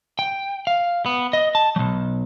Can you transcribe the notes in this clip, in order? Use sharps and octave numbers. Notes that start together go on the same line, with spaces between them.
G5
F5
B3
D#5
A5
B1 F#3